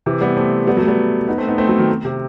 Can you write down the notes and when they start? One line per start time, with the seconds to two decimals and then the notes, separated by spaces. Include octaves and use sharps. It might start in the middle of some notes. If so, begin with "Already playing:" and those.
0.06 C3 E3
0.21 G3 B3
0.37 A3 C4
0.67 G3 B3
0.77 F#3 A3
0.87 G3 B3
1.28 B3 D#4
1.38 A3 C4
1.48 B3 D#4
1.58 A3 C4
1.68 F#3 A3
1.78 D#3 F#3
2.05 C3